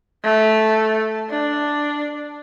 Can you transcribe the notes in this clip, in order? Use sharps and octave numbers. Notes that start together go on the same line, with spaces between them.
A3
D4